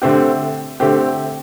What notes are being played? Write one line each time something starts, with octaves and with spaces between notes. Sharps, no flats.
D3 A3 C4 G4
D3 A3 C4 G4